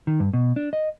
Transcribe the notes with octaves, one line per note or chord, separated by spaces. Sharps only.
D#3
G2
B2
D4
D#5